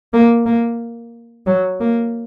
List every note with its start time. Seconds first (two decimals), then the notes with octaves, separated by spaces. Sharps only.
0.13 A#3
0.46 A#3
1.47 F#3
1.80 A#3